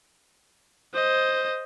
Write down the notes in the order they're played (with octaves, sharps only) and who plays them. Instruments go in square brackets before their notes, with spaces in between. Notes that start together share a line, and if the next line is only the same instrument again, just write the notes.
[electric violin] C5 D#5